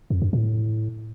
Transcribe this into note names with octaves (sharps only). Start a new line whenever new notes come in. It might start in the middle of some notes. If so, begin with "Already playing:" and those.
F2
F#2
A2